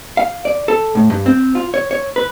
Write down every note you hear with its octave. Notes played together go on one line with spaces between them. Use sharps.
F5
D5
A4
A2
G2
C4
F4
C#5
C#5
B4